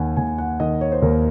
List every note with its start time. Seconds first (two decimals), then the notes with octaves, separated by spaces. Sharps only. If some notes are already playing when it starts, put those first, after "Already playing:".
Already playing: D#2 D#3 F#5 G#5
0.17 D#2 G#5
0.38 F#5
0.60 D#3 D#5
0.81 C#5
0.92 C5
1.02 D#2 A#4